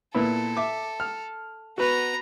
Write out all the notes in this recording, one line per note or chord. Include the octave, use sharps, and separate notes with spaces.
A#2 B3 E4 A4
E5 D6
F6
B3 F#4 B4 A#5